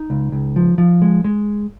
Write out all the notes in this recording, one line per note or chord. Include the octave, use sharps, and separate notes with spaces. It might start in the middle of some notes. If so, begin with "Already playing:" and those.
Already playing: D#4
C#2
C#2
F3
F3
G#3
G#3